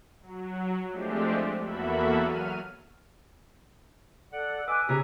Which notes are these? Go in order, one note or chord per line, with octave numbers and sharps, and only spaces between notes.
F#3
F3 G#3 A3 C4 D4 G4
E2 A#3 F#4 A4 E5 B5
F#3 F6 D#7
A4 D5 F#5
B4 D#5 G#5 D6 E6 F#6
C#3 G4 G#4 C#5 A#5